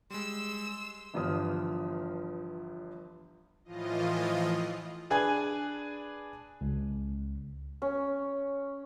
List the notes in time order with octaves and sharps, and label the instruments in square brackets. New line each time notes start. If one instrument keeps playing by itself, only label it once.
[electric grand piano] G3 G#3 [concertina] C6 [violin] E6 E7
[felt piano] G1 G2 E3 F3 D#6 F6
[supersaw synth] A2 E3 F3 F4 D#5
[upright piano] D4 G#4 B4 G#5 G#6
[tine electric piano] C#2
[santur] C#4